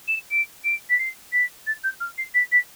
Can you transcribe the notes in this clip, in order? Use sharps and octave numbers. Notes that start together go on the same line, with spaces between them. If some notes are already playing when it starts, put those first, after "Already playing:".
E7
D7
D7
B6
C7
B6
A6
G6
F6
C7
B6
B6